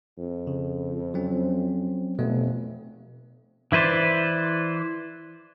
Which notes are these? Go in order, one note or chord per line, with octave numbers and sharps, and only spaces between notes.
F2
C#3
F#3 C4 C#4
F1 B2 A3
E3 E4 B4 C5 D5